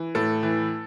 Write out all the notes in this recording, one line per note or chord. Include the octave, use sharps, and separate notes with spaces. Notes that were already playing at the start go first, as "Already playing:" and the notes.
Already playing: E3
A2 A4
E3